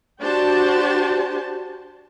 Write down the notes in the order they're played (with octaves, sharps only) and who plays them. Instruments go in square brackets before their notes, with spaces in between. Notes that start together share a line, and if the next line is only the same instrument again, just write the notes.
[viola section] D4 F#4 G4 C5 A5